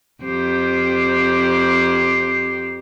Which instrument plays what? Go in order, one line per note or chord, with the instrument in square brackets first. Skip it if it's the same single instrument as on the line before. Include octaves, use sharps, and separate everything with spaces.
[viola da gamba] F2 G4 C5